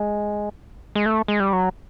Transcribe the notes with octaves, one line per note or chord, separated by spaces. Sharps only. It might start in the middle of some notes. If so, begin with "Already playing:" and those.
Already playing: G#3
G#3
A3
G#3
G3
F#3